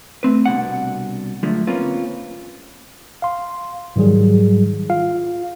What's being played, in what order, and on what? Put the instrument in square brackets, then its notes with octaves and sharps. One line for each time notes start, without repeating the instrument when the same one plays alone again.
[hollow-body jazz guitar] A3 C4 B4
C2 B2 D4 F#5
F#2 D3 F3 G#3 A3
A#3 C4 C#4 F4 B4
[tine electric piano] F5 C6
G#2 D#3 F#3 G3 G#4
F4 F5